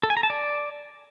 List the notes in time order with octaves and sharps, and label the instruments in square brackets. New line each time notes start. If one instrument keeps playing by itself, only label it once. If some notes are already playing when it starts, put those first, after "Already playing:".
[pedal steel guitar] A4
G#5
A#5
A5
D5